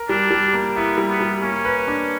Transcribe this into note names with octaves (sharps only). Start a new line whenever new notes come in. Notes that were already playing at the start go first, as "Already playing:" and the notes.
Already playing: A#4
G3 D4
G3
A#3
B3 E4
G3
B3
G3
A#3 C#4
B4
D4